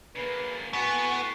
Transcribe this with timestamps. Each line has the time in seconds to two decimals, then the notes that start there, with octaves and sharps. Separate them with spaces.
0.16 C#3 A#3 B4
0.73 A2 B3 F#4 G#5